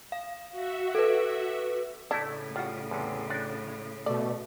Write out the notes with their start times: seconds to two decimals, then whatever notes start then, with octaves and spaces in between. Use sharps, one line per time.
0.12 F5
0.52 F#4 E5
0.95 A4 B4
2.11 A2 C#3 A3 D4 E4
2.56 G3 F4 F#4
2.91 E2 C3
3.30 D4 F#4 D5 G5
3.68 C#5
4.06 B2 A3 D5